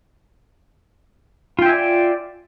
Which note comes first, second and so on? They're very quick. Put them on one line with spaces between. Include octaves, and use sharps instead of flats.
F4 G5 E5 G#5 D5